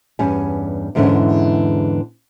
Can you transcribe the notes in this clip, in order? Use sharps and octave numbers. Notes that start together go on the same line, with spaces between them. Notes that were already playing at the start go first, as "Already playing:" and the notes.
E2 G2 G3 C#4 G#5
E2 G#2 D3 E3 C#4